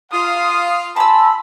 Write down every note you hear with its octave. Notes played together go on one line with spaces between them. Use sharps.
F4 F5 D#6
G#5 A5 B5 C6 E6